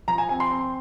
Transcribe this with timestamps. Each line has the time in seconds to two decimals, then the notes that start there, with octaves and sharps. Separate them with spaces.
0.08 F3 A#5
0.18 G#5
0.29 C4 G#5
0.40 C6
0.51 C4